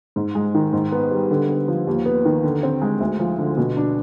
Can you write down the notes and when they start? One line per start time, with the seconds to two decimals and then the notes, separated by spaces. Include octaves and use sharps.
0.16 G#2
0.35 G#3
0.55 D#3
0.73 G#2
0.92 B3
1.11 G3
1.31 D3
1.48 B3
1.68 F3
1.87 D#2
2.06 B3
2.25 D#3
2.44 D3
2.63 C4
2.82 G#3
3.00 D2
3.20 F3
3.39 D3
3.57 B2
3.77 D4